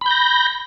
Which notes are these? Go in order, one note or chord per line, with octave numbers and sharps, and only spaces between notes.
B5 G6 A#6